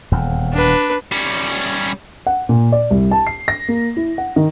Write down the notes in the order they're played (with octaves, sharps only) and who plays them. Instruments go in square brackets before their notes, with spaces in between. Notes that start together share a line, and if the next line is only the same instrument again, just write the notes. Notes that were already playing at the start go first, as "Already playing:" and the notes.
[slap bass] D#1 E2
[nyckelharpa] D4 B4
[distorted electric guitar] G3 C#4
[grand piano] F#5
A#2
D5
C2
A5
C7
A#6
A#3
E4
F#5
D#3